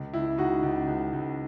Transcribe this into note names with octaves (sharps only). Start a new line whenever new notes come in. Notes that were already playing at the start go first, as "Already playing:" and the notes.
Already playing: C#2
C#2 E4
C#2 D#4 F#4
C#2
C#2
C#2